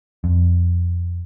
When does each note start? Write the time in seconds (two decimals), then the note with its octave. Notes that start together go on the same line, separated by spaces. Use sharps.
0.24 F2